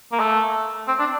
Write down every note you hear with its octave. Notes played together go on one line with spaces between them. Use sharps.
A#3
A3
C4
D4